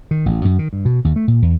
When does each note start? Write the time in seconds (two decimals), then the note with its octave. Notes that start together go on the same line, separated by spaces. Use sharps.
0.11 D#3
0.26 A1
0.45 F#2
0.59 D#3
0.73 G2
0.85 B2
1.05 D#2
1.16 A3
1.28 A#2
1.42 E2